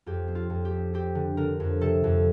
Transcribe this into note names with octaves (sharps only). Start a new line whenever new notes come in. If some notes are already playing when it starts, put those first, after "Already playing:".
F2 G4
C4
F4
F2
G4
C4
C4 G4
D3
D3 A#4
F2
C3 A4
F2